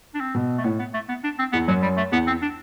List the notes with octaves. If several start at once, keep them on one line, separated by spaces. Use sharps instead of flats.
D4
C4
B2
A3
A2 B3
B3
A3
B3
D4
C4
E2 B3
F#2 F#3
G3
A3
E2 B3
C4
D4